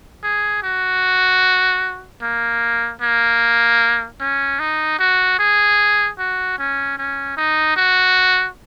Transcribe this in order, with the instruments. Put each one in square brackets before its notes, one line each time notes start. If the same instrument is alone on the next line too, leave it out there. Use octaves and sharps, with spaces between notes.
[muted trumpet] G#4
F#4
A#3
A#3
C#4
D#4
F#4
G#4
F#4
C#4
C#4
D#4
F#4